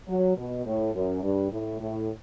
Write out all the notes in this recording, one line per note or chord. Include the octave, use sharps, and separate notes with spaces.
F#3
B2
A2
F#2
G2
A2
A2